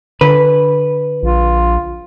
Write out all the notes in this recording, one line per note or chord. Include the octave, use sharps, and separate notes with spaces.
D3 B4
A#1 F4